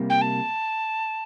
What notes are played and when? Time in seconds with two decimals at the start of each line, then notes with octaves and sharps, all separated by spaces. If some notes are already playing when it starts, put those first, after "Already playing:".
Already playing: C2 C3 G3 A#3
0.10 G5
0.22 A5